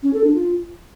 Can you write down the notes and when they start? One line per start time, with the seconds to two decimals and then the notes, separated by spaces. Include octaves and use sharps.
0.03 C#4
0.13 A4
0.24 D4
0.35 F4